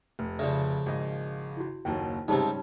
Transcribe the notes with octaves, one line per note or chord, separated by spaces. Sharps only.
F1
C#3 F3 D5 E5
G#1 D#5
E4 F#4
F#1 D#2 F#3 D#4 G5
G#2 C3 G3 C#4 D#4 A5 C6